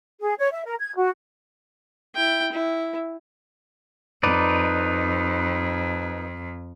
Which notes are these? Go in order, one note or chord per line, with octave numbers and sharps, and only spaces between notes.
G#4
C#5
E5
A#4
G#6
F#4
E4 G5
E4
F2 D#4 B4 D5